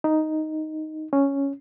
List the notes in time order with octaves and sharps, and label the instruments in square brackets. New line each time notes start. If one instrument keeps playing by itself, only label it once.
[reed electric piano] D#4
C#4